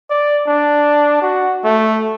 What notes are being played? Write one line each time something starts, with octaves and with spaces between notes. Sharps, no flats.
D5
D4
F#4
A3